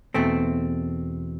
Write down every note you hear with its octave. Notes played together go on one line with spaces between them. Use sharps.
E2 B2 A3 C4